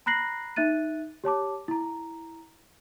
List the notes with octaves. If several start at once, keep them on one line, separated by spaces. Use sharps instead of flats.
A#5 B5 F#6 A#6 C7 F#7
D#4 E5 F#6 A6 D#7
G4 C#5 A5 D6
E4 A#5